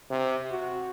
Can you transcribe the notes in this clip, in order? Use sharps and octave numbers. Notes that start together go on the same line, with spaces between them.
C3
F#4